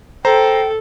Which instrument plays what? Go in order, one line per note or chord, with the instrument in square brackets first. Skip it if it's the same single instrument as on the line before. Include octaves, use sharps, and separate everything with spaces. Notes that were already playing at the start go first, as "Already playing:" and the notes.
[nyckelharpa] A4 [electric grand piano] C5 A#5 [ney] G5